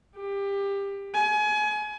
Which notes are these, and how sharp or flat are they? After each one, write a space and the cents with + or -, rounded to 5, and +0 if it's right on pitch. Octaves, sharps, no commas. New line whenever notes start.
G4 +20
G#5 +30